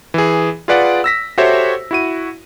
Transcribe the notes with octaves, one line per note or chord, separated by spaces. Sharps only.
E3 G#4
F4 G#4 B4 D5 F#5
E6 A#6 B6
F#4 G4 A4 C5 C#5 E5
E4 F#4 D#7